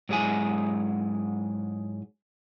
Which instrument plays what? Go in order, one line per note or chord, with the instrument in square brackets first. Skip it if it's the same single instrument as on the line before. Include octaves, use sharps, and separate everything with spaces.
[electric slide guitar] G#2 F#3 G#3 E4 G#5